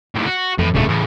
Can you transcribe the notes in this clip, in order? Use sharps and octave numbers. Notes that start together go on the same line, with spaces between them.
D#2 A2
F#4
F2 A2 E3
D1 G2 A#2 C#3 A3
A2 C#3 E3